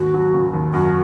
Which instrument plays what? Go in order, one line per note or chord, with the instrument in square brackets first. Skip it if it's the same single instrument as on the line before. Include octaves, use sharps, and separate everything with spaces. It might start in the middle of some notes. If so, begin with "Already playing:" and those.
Already playing: [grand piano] D#2 G#2 [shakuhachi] F#4
[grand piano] F#3
C#3
D#2
[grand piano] F#2 [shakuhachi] F#4